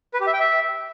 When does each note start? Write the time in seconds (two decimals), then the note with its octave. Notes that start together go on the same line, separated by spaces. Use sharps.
0.14 B4
0.20 G4
0.27 E5
0.33 G5
0.40 E5